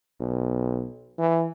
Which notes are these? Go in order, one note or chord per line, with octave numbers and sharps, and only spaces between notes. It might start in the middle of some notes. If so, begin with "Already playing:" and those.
B1
E3